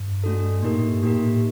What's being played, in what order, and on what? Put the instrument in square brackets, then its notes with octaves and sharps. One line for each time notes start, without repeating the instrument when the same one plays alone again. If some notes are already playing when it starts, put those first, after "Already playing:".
Already playing: [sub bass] G2
[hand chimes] A3 D4 F#4 A4
[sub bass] A#2 [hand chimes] A#3 D#4 G4 A#4
[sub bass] A2
G2
[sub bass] A2 [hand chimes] A#3 D#4 G4 A#4
[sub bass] A#2
A2